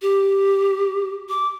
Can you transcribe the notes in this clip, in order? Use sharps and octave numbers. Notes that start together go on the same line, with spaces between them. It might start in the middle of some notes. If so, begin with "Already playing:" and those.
G4
D6